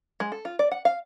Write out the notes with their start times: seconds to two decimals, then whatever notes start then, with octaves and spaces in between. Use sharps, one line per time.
0.20 G#3
0.32 A4
0.45 F4
0.59 D5
0.71 F#5
0.85 F5